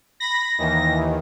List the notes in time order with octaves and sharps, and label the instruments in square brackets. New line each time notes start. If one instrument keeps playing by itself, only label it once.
[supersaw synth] B5 [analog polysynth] A#6
[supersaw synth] D#2 D#3 E3